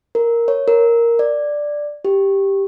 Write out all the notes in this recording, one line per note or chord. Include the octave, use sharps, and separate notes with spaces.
A#4
C#5
A#4
D5
G4